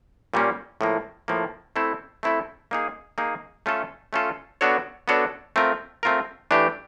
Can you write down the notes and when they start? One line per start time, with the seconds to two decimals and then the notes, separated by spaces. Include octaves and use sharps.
0.34 A#2 G3 A#3 C#4
0.81 A2 F3 A#3
1.28 A2 F3 A#3
1.76 A3 C4 E4 A4
2.23 A3 C4 E4 A4
2.71 A#3 D#4 G#4
3.18 A#3 D#4 G#4
3.66 A3 C#4 F4 A4
4.13 A3 C#4 F4 A4
4.61 B3 D4 F#4 A4 C#5
5.08 B3 D4 F#4 A4 C#5
5.56 A3 C4 F4 A#4
6.03 A3 C4 F4 A#4
6.51 E3 A3 D4 G4